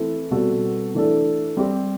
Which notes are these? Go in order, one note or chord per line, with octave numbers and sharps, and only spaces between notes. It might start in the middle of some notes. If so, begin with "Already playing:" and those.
Already playing: E3 A3 C4 E4 A4
B2 G3 C4 F#4 A4
E3 A3 D4 A4
G3 C4 G4